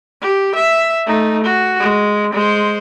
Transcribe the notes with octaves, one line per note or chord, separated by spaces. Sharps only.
G4
E5
A3 D#4
F#4
G#3
G#3 C5